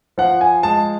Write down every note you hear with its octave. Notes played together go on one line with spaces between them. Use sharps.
F3 F#5
G#5
G#3 A5